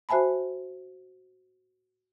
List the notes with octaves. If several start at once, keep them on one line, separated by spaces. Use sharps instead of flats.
F#4 C5 E5 G#5 A5 B5